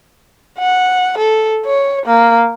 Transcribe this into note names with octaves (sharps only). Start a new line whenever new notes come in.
F#5
A4
C#5
A#3